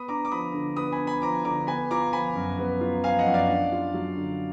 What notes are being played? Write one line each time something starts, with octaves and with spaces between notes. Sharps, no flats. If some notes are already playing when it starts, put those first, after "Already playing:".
Already playing: B3 B5 D#6
D4 A#5 D6
D6
F3 B5 D#6
D3
B3 B5 D#6
G#5 B5
D4
G#5 B5
F3 A#5 D6
D3 A#5 D6
B3 G#5 B5
F4 A#5 D6
F3 G#5 B5
F#2
B3
F4
F3 F5 G#5
D#5 F#5
F#2
D5 F5
D4
F4
F#3
D3